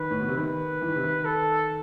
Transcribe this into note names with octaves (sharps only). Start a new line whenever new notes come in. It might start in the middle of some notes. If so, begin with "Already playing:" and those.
Already playing: D#3 B4
A2
B2
C3
D#3 B4
E3
D#3
C3
D#3
A4